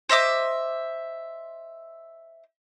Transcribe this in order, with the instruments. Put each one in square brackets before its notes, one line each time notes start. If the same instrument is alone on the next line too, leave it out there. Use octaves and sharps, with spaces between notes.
[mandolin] C5 D#5 E5 D6